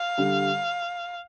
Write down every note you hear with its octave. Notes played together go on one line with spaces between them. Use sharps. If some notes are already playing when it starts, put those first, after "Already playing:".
Already playing: F5
D3 G3